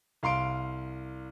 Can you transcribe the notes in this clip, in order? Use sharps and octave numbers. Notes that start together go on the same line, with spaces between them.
C2 F5 C6 D7